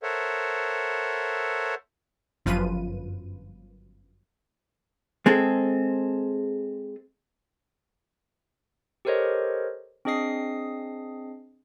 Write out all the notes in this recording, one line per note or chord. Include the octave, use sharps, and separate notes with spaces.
A4 A#4 C5 C#5 E5 F#5
G1 F#2 F3 F4 B4 D#7
G#3 C4 G#4 A4
G4 A4 A#4 C5 C#5 D#5
C4 D4 G#4 D#5 D#6 C7